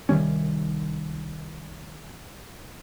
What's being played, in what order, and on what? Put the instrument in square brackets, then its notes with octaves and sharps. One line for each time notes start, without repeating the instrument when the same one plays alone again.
[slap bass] C2 D#3 G3 C#4